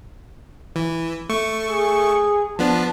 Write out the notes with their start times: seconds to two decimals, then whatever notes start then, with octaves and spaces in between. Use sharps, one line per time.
0.76 E3
1.29 A3 C#6
1.67 G#4
2.59 F3 B3 D4 A5